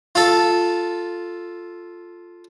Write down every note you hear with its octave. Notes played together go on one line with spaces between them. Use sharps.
F4 A4